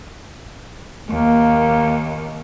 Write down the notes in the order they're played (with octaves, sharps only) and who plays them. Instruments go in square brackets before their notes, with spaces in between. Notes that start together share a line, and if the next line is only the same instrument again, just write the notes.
[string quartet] D#2 [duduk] A#3